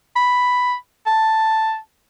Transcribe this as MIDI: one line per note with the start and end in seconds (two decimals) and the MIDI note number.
0.16 0.75 83
1.07 1.77 81